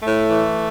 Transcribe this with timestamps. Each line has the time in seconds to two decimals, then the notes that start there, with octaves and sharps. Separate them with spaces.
0.03 A2 A3
0.30 E3